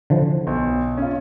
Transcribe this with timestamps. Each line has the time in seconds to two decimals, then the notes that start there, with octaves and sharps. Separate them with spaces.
0.10 D3 E3 F3
0.47 B1
0.97 C#4 F4